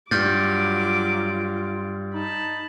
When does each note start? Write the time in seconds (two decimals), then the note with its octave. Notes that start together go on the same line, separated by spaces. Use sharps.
0.11 G2 F#3 F4 D6 F6 G6 A6
2.14 D#4 A5 B5